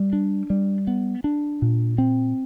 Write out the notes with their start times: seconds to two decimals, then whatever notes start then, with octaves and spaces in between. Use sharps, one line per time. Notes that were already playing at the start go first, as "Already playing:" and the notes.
Already playing: G3
0.13 D4
0.50 G3
0.87 B3
1.24 D4
1.62 A#2
1.98 C4